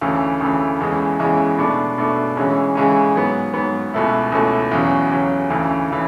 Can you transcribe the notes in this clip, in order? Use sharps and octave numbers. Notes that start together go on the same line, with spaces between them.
D2 C#3 E3
D2 C#3 E3
E2 C#3 E3 G#3
E2 C#3 E3 G#3
B2 A3 D4
B2 A3 D4
C#3 E3 G#3 C#4
C#3 E3 G#3 C#4
G#2 F#3 B3
G#2 F#3 B3
C#2 B2 A3 E4
C#2 B2 A3 E4
E2 C#3 F#3
E2 C#3 F#3
D2 C#3 E3
C#3 E3